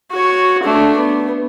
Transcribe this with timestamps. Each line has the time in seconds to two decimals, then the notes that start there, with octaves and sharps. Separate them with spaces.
0.11 F#4 C#5
0.63 A3 D4
0.97 B3